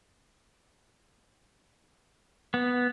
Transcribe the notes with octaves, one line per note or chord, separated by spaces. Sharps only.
B3